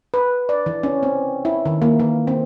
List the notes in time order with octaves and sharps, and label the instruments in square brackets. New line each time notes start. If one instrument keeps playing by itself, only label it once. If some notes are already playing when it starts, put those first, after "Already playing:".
[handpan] B4
D5
E3
C#4
C4
E4
D#3
A#3
E3
C4